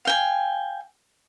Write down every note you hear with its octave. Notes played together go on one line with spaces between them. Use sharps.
F5 G5 G#5